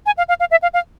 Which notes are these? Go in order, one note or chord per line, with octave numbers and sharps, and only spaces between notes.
G#5
F5
F5
F5
E5
F5
F5